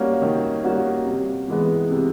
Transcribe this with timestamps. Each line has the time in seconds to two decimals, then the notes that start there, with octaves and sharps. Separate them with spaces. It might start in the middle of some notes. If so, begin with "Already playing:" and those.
Already playing: G3 A#3 C#4 F#4
0.22 D#3
0.64 G3 A#3 C#4 F#4
1.06 C3
1.48 E3 G#3 B3
1.90 C3